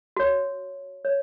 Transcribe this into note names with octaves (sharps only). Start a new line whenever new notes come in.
F#4 C#5
C#5